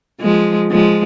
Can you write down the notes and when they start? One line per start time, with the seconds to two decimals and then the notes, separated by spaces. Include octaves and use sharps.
0.21 F3 G#3
0.71 F3 G#3